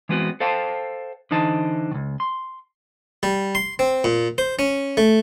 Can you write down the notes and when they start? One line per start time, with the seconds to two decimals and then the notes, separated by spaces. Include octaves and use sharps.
0.09 E3 G#3 B3 C4 F#4
0.40 A4 C5 F5 G5 A5
1.31 D3 E3 D#4 C5 A5
1.91 C#2 D#3
2.20 C6
3.23 G3
3.55 C6
3.79 C4
4.04 A#2
4.38 C5
4.59 C#4
4.97 A3